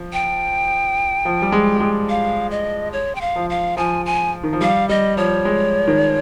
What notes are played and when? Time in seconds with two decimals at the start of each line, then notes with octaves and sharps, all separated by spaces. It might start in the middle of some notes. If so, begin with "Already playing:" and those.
Already playing: F3
0.13 G5
1.25 F3
1.42 G3
1.52 G#3
1.76 G3
1.80 G#3
2.09 F5
2.51 D#5
2.93 C#5
3.15 G5
3.21 F5
3.36 F3
3.50 F5
3.77 F3 G#5
4.06 G#5
4.43 D#3
4.53 F3
4.61 G3 F5
4.89 G3 D#5
5.17 F3 C#5
5.45 G#3
5.87 D#3